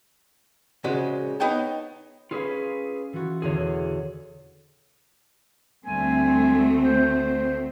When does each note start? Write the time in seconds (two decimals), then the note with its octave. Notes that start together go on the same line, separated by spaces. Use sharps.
0.84 A#2 C#3 F3 G#3 F#4
1.40 B3 D#4 C#5 G5 A5
2.31 C#4 F4 G#4 B4 F5
3.13 E3 F4 F#4
3.42 E1 E2 D3 G#4 C#5
5.85 D2 G3 A3 C4 G#5
6.82 C5